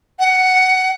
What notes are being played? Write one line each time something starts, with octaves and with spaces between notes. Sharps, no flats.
F#5